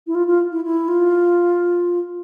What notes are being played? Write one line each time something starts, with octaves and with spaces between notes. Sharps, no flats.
E4
F4
F4
E4
E4
F4